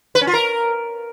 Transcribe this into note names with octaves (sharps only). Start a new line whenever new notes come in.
B4
C#4
F4
A#4